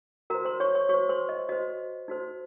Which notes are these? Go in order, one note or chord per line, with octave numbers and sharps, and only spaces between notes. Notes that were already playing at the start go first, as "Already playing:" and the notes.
F#4 A#4 C5 A#5
C5 C6
C#5 C#6
C#5 C#6
F#4 C5 C#5 C#6
C5 C6
D#5
F#4 C5 D#5
D#4 F#4 C5